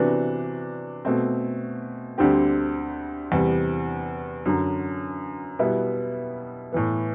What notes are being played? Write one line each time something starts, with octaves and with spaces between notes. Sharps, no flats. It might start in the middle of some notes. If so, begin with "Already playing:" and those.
Already playing: C3 E3 B3 D4 F#4
B2 A3 C4
D2 D3 G3 C4 G4
E2 C3 G3
F#2 D3 F#3
B2 G3 B3 E4
A2 E3 B3